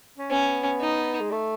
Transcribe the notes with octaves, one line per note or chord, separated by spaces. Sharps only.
C#4
B3 C#4
D#4
G#3
A3